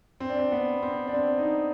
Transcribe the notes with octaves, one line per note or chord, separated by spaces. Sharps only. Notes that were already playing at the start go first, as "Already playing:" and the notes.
C4
D4
C4
B3
C4
D4
C4
D#4